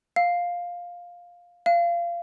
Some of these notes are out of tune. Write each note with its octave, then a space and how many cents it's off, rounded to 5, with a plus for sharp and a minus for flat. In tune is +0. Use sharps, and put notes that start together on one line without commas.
F5 +10
F5 -20